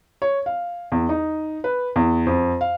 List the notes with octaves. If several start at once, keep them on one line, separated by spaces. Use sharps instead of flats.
C#5
F5
E2
D#4
B4
E2
F2
F5